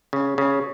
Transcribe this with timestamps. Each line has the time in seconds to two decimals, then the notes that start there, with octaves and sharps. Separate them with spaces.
0.13 C#3
0.38 C#3